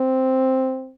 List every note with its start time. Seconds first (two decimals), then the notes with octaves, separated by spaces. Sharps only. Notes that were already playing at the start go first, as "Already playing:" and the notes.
Already playing: C4